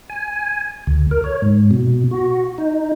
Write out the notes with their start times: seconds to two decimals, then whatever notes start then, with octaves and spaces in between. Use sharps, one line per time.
0.10 G#5
0.87 D2
1.11 A#4
1.24 C#5
1.42 G#2
1.71 B2
2.11 F#4
2.58 D#4